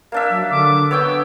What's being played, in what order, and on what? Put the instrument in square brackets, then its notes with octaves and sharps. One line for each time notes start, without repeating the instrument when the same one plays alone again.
[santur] A#3 D4 E5
[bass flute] F#3
[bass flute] D3 [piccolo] D6
[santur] B3 C#5 G5 [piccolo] E6